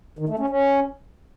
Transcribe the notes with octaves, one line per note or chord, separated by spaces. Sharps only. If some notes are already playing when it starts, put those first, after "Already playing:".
D#3
A3
C#4
C#4